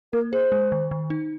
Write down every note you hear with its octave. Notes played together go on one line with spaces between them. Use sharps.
A#3 A#4
G#4 C5
G#3
D#3
D#3
D#4